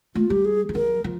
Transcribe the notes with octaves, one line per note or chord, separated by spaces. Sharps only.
A3 F4
G3 G4
G#4
F3
F#3 A#4
F3